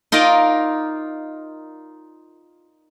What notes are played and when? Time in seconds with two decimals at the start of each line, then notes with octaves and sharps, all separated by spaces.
0.12 D#4 F4 A#4 D5 D#5